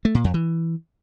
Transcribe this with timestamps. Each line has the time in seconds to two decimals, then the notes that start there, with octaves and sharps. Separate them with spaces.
0.05 A3
0.15 A#2
0.24 F2
0.34 E3